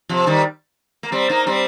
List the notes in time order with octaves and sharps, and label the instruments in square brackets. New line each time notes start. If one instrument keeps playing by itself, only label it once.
[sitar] C3 F3
D#3 G3
A#3
G3 C4
A#3 D#4
G3 C4